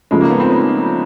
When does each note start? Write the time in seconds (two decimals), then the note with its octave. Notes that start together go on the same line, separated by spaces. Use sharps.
0.11 C#3 F3 G#3 A3
0.21 A#3
0.31 B3
0.40 C4
0.50 D#4